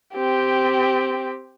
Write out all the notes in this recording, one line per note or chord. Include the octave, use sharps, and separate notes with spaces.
C4 G4